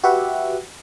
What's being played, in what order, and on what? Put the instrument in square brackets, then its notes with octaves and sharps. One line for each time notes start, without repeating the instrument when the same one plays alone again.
[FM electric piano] F#4 G4 B4 E5 F#5